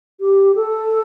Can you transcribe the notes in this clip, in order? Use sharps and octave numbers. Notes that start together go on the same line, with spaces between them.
G4
A4